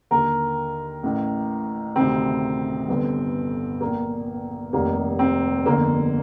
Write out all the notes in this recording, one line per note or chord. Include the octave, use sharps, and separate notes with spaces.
D#2 D3 A#4
A1 A2
D2 C3 D#3 C4
G1 G2 D3
A#1 A#2 A#3
F1 F2 C3 D#3 A#3
C4
G1 F2 D3 A#3